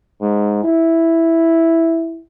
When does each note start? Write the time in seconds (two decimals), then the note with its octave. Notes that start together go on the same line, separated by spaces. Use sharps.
0.21 G#2
0.64 E4